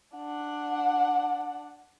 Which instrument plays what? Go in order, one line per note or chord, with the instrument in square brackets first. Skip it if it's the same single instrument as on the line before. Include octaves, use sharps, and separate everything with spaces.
[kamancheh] D4 F#5